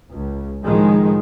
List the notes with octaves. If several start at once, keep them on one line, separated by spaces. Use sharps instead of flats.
C#2
A2 D#3 F3 G#3